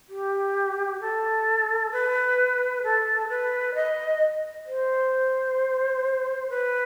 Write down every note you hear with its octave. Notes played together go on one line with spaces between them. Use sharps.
G4
A4
B4
A4
B4
D#5
C5
B4